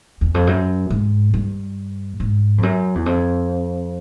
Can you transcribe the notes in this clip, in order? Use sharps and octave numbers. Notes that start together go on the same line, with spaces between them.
E2
F2
F#2
G#2
G2
G#2
F2
F#2
E2
F2